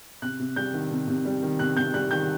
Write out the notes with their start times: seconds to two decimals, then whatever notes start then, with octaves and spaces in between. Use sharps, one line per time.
0.22 C3 F#6
0.40 C3
0.56 G3 G6
0.73 D#3
0.91 C3
1.07 C3
1.25 G3
1.43 D#3
1.59 C3 F#6
1.77 C3 G6
1.94 G3 F#6
2.11 D#3 G6